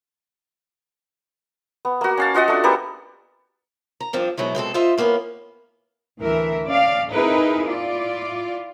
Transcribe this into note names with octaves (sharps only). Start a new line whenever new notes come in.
B3
A#3 F#4
C#4 F5 A5
F4 F#4 D#5 F#5
A3 D4
A#3 B3 G4 A4
A#5
G2 F3 C4 D4
B2 F#3 G#3 E4
B2 G#3 C4 A4
F4 A4 C5 D#5 E5
A2 A#3 B3 C#4
D2 E3 A#4 E5
C#4 D5 F5
C4 D#4 E4 G#4 A#4 B4
E4 F4 D5